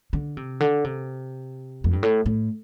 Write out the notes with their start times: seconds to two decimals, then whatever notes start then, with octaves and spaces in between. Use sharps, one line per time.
0.13 D3
0.37 C3
0.60 D3
0.84 C3
1.84 F2
1.93 G2
2.03 A2
2.26 A2